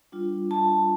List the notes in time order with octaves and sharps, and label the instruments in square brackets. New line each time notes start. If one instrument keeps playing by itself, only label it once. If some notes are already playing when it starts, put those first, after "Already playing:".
[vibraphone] G3 D4 F4
A5